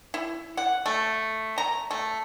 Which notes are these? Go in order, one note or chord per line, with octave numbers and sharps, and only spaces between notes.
E4
F#5
A3
A#5
A3